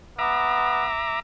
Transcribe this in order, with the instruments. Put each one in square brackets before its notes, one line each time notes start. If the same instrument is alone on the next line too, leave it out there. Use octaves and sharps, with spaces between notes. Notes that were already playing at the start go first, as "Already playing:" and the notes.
[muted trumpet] B3 [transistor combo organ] E5 A#5 D6